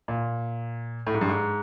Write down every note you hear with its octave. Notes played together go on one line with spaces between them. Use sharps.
A#2
A2
G#2
G2
G#2